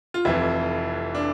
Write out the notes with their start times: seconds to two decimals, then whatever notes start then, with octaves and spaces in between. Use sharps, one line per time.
0.14 F4
0.25 F1 F2 E3 E4
1.15 D4